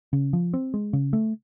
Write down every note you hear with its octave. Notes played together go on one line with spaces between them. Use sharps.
C#3
F3
C4
G#3
C#3
A3